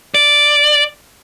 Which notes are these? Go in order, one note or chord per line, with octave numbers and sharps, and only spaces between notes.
D5